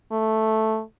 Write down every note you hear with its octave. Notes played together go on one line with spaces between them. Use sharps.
A3